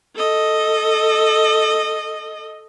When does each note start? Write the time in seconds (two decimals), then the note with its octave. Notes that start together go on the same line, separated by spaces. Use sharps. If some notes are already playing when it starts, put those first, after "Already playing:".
0.16 A4 D#5